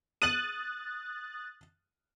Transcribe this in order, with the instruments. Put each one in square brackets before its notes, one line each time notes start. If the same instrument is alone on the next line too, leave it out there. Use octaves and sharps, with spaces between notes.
[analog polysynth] D#6 F#6 A6 [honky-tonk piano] D#7 F#7